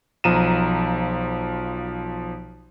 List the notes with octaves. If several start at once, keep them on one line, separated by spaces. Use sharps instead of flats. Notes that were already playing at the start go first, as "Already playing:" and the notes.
B1 F3 A#5 D#7 E7